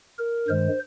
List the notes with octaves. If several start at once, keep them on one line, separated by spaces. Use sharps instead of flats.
A#4
G2 D#3 G#3 C5